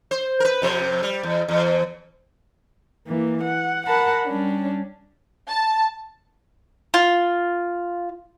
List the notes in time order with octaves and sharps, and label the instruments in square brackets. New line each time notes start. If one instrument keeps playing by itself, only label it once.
[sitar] C5
A#4 B4
F2 C3 C5
G3
E2
E2
[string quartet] E3 A#3
F#5
A#4 F#5 A5 B5
G3 C#4 D4
[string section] A5
[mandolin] F4